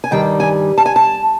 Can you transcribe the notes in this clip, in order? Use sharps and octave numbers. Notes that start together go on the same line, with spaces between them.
G#5
G2 D#3 G3 G5
G#5
A5
G#5
A5